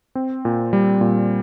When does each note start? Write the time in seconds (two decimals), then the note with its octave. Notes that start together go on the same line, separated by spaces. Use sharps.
0.15 C4
0.45 A#2
0.73 G3
1.01 A#2